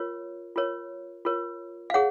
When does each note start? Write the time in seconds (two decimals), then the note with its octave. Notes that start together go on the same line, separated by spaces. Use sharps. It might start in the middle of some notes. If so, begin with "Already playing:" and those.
Already playing: F4 A#4 C#5
0.56 F4 A#4 C#5
1.25 F4 A#4 C#5
1.90 F5
1.94 G#4 C#5 F#5